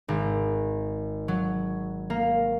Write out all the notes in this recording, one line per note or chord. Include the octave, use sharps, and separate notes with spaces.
G#1
F#3
A#3